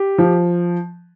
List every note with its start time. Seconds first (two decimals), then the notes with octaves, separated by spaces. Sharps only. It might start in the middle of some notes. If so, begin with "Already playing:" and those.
Already playing: G4
0.18 F3